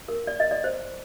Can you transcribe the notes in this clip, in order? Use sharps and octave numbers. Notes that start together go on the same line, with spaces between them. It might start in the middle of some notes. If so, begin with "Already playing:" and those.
A#4
D5
D#5
D5
C5